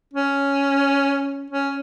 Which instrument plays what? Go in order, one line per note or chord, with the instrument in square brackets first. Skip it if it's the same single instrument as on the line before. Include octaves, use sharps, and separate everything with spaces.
[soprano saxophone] C#4
C#4